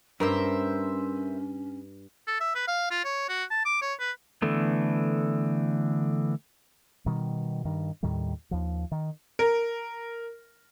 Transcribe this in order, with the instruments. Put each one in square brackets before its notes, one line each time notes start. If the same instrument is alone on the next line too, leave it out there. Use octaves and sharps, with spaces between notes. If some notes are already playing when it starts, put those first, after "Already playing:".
[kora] G2 [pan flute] C#4 [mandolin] A#4 C5 E5
[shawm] A4
E5
B4
F5
F4
C#5
F#4
A5
D6
C#5
B4
[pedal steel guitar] D3 E3 A3 B3
[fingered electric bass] B2 D#3 G3
G2 D#3
D#2 A2 D#3 G3
D#2 F3
D#3
[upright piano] A#4